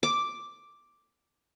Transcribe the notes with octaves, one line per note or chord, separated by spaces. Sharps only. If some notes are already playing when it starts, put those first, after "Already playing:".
D6